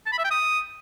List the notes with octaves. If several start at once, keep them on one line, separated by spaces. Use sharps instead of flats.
A5
B5
E5
G5
D#6